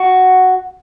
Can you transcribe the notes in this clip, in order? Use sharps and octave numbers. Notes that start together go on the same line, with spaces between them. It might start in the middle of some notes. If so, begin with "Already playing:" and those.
Already playing: F#4